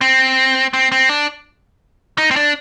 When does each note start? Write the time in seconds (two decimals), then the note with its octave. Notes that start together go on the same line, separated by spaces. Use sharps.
0.01 C4
0.73 C4
0.92 C4
1.09 D4
2.18 D#4
2.31 C4
2.36 D4